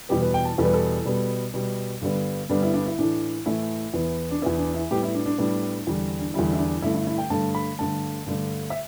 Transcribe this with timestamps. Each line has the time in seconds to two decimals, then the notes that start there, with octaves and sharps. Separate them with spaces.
0.09 E2 B2 G3 B3 G4
0.22 B4
0.34 G5
0.45 A5
0.58 E2 B2 G3 B3 A4
0.65 B4
0.73 A4
1.05 B2 G3 B3
1.54 B2 G3 B3
2.01 G2 D3 G3 B3
2.49 G2 D3 G3 B3 D4
2.63 E4
2.74 D4
2.86 E4
2.99 A2 E3 A3 D4
3.46 A2 E3 A3 E4
3.94 E2 E3 B3
4.31 D4
4.42 E2 E3 B3 E4
4.58 D4
4.74 E4
4.91 A2 G3 B3 G4
5.03 E4
5.15 D4
5.26 D4
5.38 A2 G3 B3 D4
5.87 E2 D3 G3
6.20 D4
6.34 E2 D3 G3 E4
6.53 E4
6.58 D4
6.82 G2 D3 A3 E4
6.95 E4
7.07 E4
7.18 G5
7.30 G2 D3 A3 A5
7.55 B5
7.79 G2 D3 A3 A5
8.26 G2 D3 A3
8.70 E5